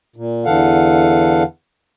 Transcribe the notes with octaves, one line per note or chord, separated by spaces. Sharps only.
A#2
E2 D3 E3 A4 F5 F#5